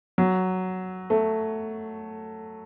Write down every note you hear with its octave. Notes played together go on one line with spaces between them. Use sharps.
F#3
A3